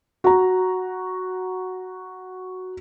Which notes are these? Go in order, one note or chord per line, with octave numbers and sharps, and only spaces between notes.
F#4 A#5